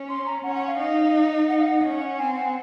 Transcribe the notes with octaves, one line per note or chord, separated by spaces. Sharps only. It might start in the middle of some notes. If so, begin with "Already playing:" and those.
Already playing: C#4
C6
A#5
C#4 F#5
F#5
F5
D#4
F#5
F5
F#5
C#4
C4 G#5
F#5